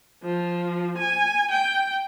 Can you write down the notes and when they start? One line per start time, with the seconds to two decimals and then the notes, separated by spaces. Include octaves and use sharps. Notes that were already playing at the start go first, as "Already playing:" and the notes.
0.23 F3
0.97 G#5
1.51 G5